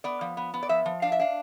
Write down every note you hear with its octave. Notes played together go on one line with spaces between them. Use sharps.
B3 D5
F3
B3
B3
D5
F3 E5
F3
D4 F5
E5
D4 F5